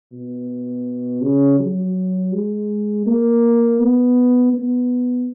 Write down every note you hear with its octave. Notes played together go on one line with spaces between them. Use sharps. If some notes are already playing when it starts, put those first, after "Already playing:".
B2
C#3
F#3
G#3
A#3
B3
B3